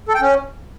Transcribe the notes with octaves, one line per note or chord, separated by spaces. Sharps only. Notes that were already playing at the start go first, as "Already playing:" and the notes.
A4
G5
C#4